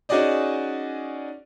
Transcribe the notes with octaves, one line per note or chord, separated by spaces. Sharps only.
C#4 D#4 F#4 G#4 D5 D#5